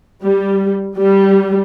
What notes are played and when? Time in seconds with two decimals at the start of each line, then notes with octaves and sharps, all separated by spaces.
0.24 G3
0.96 G3